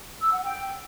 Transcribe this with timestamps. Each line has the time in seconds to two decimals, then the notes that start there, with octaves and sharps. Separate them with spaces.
0.20 E6
0.32 F#5
0.43 G5